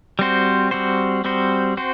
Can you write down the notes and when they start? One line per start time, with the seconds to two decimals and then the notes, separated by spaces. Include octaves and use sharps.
0.19 G3 C4 F#4 C5
0.71 G3 C4 F#4 C5
1.24 G3 C4 F#4 C5
1.77 C4 F#4 C5